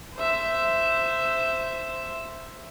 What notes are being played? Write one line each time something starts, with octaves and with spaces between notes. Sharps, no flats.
C5 E5